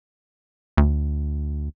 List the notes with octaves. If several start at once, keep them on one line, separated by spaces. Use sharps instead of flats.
D2